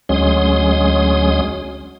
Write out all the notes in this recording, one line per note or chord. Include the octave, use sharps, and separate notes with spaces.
D2 F#3 G#3 C#4 C6 D#6